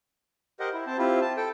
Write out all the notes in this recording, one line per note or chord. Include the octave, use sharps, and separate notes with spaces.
G4 A#4 C5 D#5 F#5
E4
C4 C5 A5
C4 E4 F4 G4
A5
A4 G5